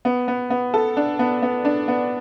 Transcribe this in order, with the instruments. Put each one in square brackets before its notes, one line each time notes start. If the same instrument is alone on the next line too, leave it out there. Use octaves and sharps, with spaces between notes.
[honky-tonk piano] B3
B3
B3
A4
D4
B3
B3
D4
B3